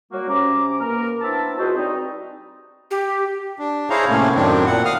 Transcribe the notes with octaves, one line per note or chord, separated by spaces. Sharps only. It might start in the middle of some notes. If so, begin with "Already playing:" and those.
F#3 G3 A#3 F#4
C3 C#4 A#5 D6
B2 A#3 A#4
B3 C4 D4 E4 E5 A5
C#2 F#4 C5 D#5
G3 C4 D#4
G4
D4
E4 G#4 C5 C#5 F5 A#5
A2 C3 A3 A#3 C#4
F#2 A2 D#3 C4 D4
A#2 F#5
F5 D#6 F6